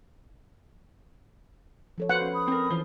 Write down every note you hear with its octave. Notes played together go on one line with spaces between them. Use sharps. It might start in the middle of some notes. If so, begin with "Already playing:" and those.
F3 A4 C#5
F#4 B4 C5 F5 F#5
C#4
B5 D#6
C4 A#4
E3 F3 C5